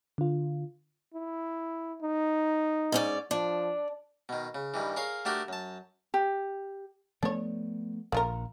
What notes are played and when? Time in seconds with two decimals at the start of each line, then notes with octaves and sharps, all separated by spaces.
0.18 D3 F4
1.14 E4
2.02 D#4
2.92 G#2 C#4 D5
3.31 F3 D4
4.29 B2 D#3
4.55 C#3
4.74 G2 D#3 E3
4.96 G#4 A#4 C#5 F5
5.25 A3 D4 F#4 G4 A4 A#4
5.48 F#2 A5
6.14 G4
7.23 F3 A3 B3 D4 C#5
8.12 A#1 A#3 F4 A#4